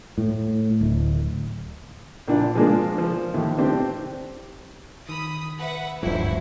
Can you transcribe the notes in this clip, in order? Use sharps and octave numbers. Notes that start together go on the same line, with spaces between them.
A2
D1
A#1 D4 F4
F3 G#3 A#3 D4 F4
F3
D#2 A2
C4 D4 G4
D#3 B5 D#6
B4 E5 F#5
D1 G#1 G2 F3 F#3 E4 F#4 C5